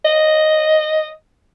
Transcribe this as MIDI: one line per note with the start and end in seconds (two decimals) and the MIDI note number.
0.05 1.09 75